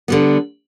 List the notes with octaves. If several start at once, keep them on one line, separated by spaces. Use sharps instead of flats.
D3 G3 B3